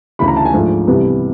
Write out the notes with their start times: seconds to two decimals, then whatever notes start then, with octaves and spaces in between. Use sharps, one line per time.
0.19 D2 C#3 E3 B5
0.28 A#5
0.36 A5
0.45 G#5
0.53 G#2 F3 A3 D4
0.87 C2 C3 E3 G3 B3